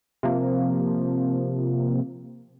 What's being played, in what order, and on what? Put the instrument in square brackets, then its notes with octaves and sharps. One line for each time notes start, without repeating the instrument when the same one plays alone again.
[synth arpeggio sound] C3 F3 A#3